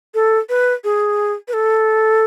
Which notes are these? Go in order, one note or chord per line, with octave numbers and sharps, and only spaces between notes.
A4
B4
G#4
B4
A4